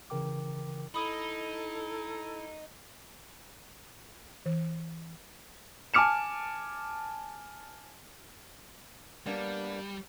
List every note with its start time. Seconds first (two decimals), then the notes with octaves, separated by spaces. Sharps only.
0.10 C#3 E3 A#4 G5 D6
0.94 D#4 E4 A4 B5 D#6
4.46 E3
5.94 G#5 A5 D6 F6 C#7 E7
9.26 G3 A#3 B3 D4